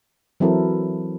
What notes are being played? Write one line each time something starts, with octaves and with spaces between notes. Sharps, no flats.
E3 F#3 C4 E4 A4 A#4